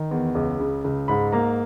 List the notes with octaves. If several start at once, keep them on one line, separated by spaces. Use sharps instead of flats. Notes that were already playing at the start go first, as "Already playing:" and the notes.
Already playing: D#3
E2
C#2
C#3
C#2
G#2 B5
A#3 A#5